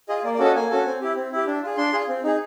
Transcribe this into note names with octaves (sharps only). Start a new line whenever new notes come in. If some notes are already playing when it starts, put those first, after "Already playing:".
F4 G#4 D#5
A#3 D5
D5
C#4 F#4 A4
D#5
A#3 G#5
C#4 F#4 A4
C4
E4 G4
C4
E4 G4
D4
F4 G#4
D4 C6
F4 G#4
C4
D#4 G#4